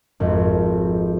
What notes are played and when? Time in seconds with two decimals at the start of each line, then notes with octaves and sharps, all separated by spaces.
0.20 G#1 F2